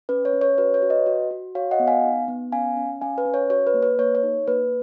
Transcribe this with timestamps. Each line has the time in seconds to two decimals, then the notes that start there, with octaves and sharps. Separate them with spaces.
0.09 C#4 B4
0.25 C#5
0.33 C#4
0.41 C#5
0.58 F#4 B4
0.74 C#5
0.82 F#4
0.90 B4 D#5
1.06 F#4
1.31 F#4
1.55 F#4 C#5 F5
1.71 D#5 F#5
1.80 B3
1.87 F5 G#5
2.04 D#4
2.28 B3
2.52 C#4 F5 G#5
2.77 C#4
3.01 C#4 F5 G#5
3.18 B4
3.26 C#4
3.34 C#5
3.50 F#4 C#5
3.67 B4
3.74 A#3
3.82 B4
3.99 A#3 C#5
4.15 C#5
4.23 D#4
4.47 A#3 B4